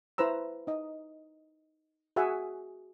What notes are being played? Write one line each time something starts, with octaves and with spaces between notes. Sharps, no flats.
E4 B4 C5 A#5 E6
D#4 D#5
F#4 G#4 E5 F#5 G#5